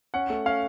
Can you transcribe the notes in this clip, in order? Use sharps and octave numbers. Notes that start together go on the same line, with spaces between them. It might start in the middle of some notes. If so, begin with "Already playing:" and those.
C#4 F#5
A3
C#4 F5